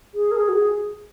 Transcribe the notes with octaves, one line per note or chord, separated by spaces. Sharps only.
G#4
A#4
G#4
F#4
G#4